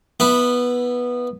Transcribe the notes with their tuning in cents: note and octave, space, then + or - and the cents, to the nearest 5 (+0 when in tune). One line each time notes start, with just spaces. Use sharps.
B3 -10 E4 +0